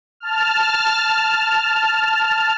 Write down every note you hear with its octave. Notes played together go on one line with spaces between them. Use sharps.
A5 F6